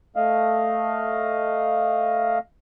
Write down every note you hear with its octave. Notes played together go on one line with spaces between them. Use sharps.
A3 D#5 F5